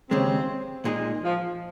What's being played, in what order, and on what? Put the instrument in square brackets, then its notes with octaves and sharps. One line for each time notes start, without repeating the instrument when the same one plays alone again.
[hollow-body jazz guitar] D#2 C#3 G#3 [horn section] C4
[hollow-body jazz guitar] A#2 G#3 D#4 G#4
[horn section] F3